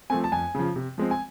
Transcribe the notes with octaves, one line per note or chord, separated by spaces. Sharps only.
F3 A3 C4 G#5
A5
F2 G#5
C#3 F3
C3
F3 G#3 C4
G#5